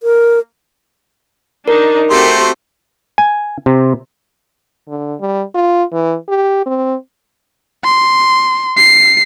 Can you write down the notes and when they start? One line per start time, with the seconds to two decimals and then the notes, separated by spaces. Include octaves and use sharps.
0.03 A#4
1.68 D4 D#4 A#4
2.10 A3 C4 F#4 G4 C6
3.18 G#5
3.66 C3
4.89 D3
5.20 G3
5.55 F4
5.93 E3
6.28 G4
6.66 C4
7.84 C6
8.77 C7